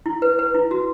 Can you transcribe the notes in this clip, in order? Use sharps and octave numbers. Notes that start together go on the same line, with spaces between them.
E4
B4
B4
E4
F#4